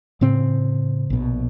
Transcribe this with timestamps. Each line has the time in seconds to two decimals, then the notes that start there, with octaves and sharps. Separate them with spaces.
0.21 A2 C#3 C4
1.10 A#1 B2